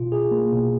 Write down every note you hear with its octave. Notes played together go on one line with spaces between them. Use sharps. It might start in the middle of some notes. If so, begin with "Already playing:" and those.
Already playing: B2 F4
G#4
A#3
B2